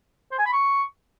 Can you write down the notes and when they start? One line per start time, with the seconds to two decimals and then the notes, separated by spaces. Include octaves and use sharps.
0.31 C5
0.38 G#5
0.46 B5
0.53 C#6